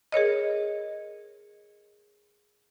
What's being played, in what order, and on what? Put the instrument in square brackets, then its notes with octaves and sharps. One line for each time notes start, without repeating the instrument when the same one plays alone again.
[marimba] G#4 A#4 C#5 D#5